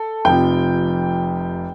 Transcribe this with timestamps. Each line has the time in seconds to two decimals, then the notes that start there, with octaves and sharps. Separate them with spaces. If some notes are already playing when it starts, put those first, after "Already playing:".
Already playing: A4
0.25 F1 F2 C3 F3 G5